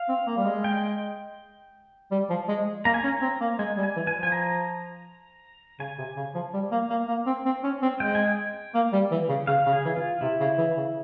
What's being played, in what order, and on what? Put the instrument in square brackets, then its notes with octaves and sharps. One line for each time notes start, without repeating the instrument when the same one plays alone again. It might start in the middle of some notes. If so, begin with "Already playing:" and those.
Already playing: [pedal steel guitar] F5
[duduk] C4
A#3
G3
G#3
[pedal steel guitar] G5
[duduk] G3
F3
G#3
[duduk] A#3 [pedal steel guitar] A#5
[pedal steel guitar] G#5
[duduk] C#4 [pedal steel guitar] A#5
[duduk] C4
A#3
[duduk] G#3 [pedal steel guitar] G#5
[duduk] G3
[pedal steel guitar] G#5
[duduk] E3
[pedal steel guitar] G#5
[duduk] F3
[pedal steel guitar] G#5
A#5
[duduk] C#3 [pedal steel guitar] G#5
[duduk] C3
C#3
F3
G3
A#3
A#3
A#3
C4
C4
C#4
C4
[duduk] G#3 [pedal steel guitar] G5
[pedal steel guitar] G#5
G5
[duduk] A#3
G3
E3
C#3
[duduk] C#3 [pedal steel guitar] F5
[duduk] C#3
[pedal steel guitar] G#4
[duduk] E3
[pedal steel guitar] F4
[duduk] C3 [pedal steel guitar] E4
[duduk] C#3
E3
C#3